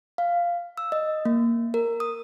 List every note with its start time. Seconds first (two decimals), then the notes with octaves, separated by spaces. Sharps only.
0.18 F5
0.78 E6
0.92 D#5
1.25 A#3
1.74 A#4
2.00 D#6